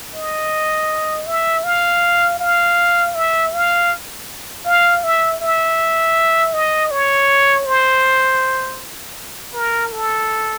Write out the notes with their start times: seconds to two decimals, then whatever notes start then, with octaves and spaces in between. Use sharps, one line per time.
0.14 D#5
1.26 E5
1.64 F5
2.40 F5
3.15 E5
3.53 F5
4.65 F5
5.04 E5
5.41 E5
6.53 D#5
6.91 C#5
7.66 C5
9.54 A#4
9.92 A4